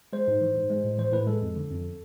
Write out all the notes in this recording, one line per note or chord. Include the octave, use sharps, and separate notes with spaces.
G#3 C5
G#2
E3
G#2
G#3
A2
E3 C5
A2 B4
G#3 A4
F2
D3
F2